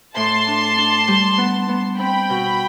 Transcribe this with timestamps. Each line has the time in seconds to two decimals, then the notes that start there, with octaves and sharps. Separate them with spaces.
0.15 A2 A5 C6
0.47 D4
0.77 D4
1.08 G3
1.38 B3
1.69 B3
1.99 C4 G5 B5
2.30 B2